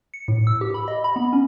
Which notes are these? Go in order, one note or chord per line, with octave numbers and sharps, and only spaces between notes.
C#7
A2
E6
G4
B5
D#5
B5
B3
C#4